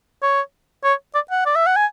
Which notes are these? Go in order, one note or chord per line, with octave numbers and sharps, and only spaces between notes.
C#5
C#5
D5
F#5
D5
E5
F#5
G#5